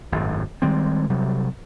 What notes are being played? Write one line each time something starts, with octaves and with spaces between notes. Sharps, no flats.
G#1 F#2 A2
D#3 G3 G#3 C4
C3 F#3 G3